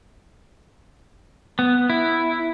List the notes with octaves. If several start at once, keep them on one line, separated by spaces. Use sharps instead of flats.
B3
E4